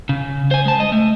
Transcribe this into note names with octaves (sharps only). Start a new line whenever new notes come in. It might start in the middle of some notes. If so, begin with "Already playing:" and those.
C#3
C5 G#5
G#3 A5
D#5
A3